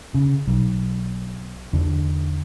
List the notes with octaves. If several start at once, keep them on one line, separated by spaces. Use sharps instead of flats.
C#3
B1
E2 D3